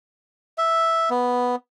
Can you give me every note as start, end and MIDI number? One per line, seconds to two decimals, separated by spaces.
0.58 1.10 76
1.10 1.56 59